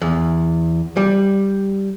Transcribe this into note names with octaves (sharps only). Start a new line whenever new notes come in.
E2
G3